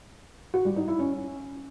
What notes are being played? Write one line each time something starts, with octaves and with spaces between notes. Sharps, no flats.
F#4
G3
D#4
E4
C#4